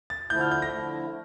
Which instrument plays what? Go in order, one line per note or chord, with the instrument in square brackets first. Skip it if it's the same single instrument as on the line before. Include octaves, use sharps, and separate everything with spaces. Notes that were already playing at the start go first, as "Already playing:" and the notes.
[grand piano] A6
[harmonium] D3 F3 A3 E4 [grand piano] G6
[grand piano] F6
G6
A#6
[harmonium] D3 F3 A3 E4